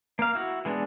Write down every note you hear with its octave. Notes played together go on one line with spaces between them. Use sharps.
A#3 F5
E4 F#4
E3 G#3 B3 D4